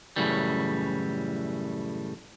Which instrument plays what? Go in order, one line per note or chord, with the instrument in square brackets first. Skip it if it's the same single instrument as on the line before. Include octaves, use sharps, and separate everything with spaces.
[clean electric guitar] F#2 A2 C#3 E3 G3